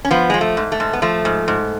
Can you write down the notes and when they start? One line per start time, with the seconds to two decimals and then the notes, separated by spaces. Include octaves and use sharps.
0.05 C#4
0.11 F3 B3
0.30 F3 G#3
0.41 A3
0.57 G#2
0.72 A3
0.80 G#2
0.93 B3
1.02 F3 A3
1.25 G#2
1.48 G#2